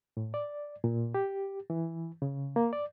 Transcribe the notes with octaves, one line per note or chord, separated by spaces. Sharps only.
A2
D5
A#2
G4
E3
C#3
A#3
D5